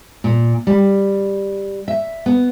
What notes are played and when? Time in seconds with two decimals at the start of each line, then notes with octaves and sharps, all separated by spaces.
0.24 A#2
0.67 G3
1.88 E5
2.26 B3